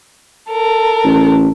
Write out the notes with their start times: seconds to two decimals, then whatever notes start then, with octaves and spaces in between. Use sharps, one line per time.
0.51 A4 A#4
1.04 A1